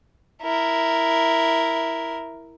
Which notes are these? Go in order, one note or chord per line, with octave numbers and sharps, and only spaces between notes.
E4 A#4